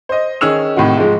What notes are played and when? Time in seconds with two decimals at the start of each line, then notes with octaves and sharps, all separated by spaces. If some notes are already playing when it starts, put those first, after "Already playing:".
0.09 C5 D#5
0.41 D#3 C#4 G#4 E6 F7
0.76 A2 C3 D#3 F#4
0.97 G#2 F3 G#3